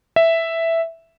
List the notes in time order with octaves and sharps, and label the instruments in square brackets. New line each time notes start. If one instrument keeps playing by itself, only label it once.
[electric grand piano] E5